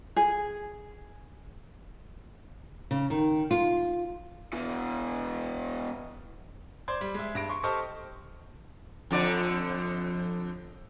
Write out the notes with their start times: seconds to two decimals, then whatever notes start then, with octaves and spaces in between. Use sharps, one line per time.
0.16 G#4
2.91 C#3
3.10 D#3
3.51 F4
4.53 B2 E3
6.88 C5 D5 C6 G#6
7.01 G3
7.14 G#3 E5
7.35 G2 A#6 D7
7.49 C6 C#6
7.63 G4 A4 C5 D#5 C#6 F6
9.11 F2 D3 D5